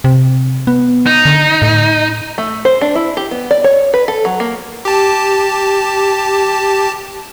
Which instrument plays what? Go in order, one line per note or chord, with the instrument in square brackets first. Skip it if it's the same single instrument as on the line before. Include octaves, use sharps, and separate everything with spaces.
[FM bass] C3
B3
[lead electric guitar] D#4
[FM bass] D3
A2
[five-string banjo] A3
C5
D4
E4
G4
B3
D5
C#5
B4
A4
F#3
A#3
[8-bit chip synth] G4 A5